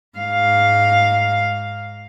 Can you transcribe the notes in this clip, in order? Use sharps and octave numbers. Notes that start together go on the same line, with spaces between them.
G#2 F5